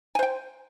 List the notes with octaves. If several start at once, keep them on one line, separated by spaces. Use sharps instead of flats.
C5 G5 G#5